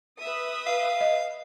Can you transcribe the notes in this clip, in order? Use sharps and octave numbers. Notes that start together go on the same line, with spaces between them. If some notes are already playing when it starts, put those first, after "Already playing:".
B4 E5 D#6
F5
D#5